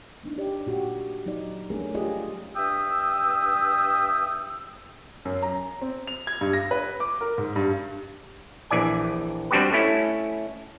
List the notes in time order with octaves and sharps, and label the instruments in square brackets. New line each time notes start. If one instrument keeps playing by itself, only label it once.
[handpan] A#3 D4 D#4
G4 D5
A#2 F#4 G4
F#3 D#4 D5
A3 A#3 C#4 D4 G#4 A#4
F4 G4 G#4 D5 D#5
[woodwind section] G2 E5 G5 D#6 E6
[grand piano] F#2
A#5
C4
F7
G#6
G2
A#6
B4
D6
A#4
G#2
G2
[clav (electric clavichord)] A#1 E3 D5 G#5
G3 C4 D4 F#4 G4 B4
A3 C#4 E4